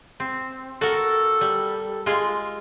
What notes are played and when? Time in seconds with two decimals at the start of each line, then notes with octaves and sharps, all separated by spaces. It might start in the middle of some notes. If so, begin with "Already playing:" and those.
0.20 C4
0.81 F#4 A4 A#4
1.41 G3
2.06 G#3 F4